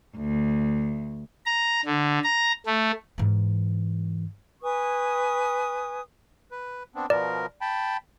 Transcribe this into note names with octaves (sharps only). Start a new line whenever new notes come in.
D2
A#5
D3
A#5
A3
G#2 E3
B4 G#5 C#6 D#6
B4
B3 C4 D4
B2 F3 A#4 D5
G5 A5 B5